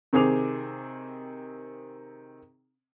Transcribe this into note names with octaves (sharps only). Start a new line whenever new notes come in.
C3 D#3 C4 G#4 D6 F7